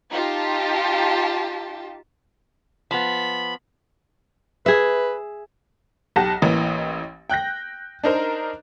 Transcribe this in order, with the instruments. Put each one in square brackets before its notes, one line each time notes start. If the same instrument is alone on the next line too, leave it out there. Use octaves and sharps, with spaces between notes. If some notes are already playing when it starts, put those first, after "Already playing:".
[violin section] D#4 F4 G4 A5
[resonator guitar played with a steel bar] F3 B3 [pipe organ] B5
[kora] G#4 E5 [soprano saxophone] B4
[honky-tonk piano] B1 G4 F#5 A5 A#6
A1 E3 A#3 D#5
G5 F#6 G6 A#6
D4 D#4 A#4 C5